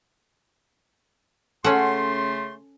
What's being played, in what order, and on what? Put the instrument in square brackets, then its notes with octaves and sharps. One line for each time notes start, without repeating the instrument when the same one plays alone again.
[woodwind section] C#3 A3 C6 [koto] C#4 A4 [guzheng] F#5